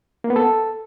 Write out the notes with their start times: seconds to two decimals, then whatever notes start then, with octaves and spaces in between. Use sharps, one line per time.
0.24 A#3
0.30 B3
0.36 A4